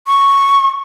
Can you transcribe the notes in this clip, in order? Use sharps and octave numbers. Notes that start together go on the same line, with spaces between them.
C#6